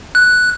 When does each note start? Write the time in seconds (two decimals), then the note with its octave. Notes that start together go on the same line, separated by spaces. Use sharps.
0.15 F#6